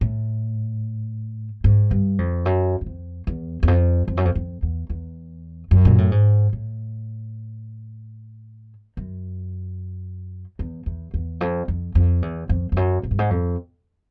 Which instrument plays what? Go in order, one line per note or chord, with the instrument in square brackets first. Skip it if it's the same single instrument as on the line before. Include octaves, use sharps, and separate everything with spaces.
[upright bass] A2
G#2
G2
F2
F#2
F#2
F2
E2
E2
F2
F2
F#2
F2
F2
E2
E2
F#2
A#2
A2
G#2
A2
F#2
E2
E2
E2
F2
F2
F2
E2
F2
F2
F#2
G#2
G2
G#2
F2